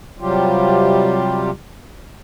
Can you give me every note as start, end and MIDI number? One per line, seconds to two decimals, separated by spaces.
0.20 1.50 48
0.20 1.50 54
0.20 1.50 55
0.20 1.50 65
0.20 1.50 67